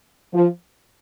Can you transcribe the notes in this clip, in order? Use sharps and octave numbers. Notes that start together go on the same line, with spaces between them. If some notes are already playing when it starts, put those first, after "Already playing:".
F3